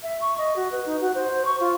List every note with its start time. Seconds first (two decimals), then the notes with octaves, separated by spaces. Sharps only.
0.03 E5
0.21 C#6
0.38 D#5
0.56 F#4
0.72 B4
0.86 D#4
1.01 F#4
1.15 C5
1.45 C#6
1.60 F4